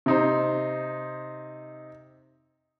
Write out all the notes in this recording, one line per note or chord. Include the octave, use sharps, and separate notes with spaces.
C3 D#4 C5